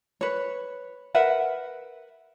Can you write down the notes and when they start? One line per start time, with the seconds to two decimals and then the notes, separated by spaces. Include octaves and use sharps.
0.21 B4 C#5
1.14 A#4 B4 E5 F#5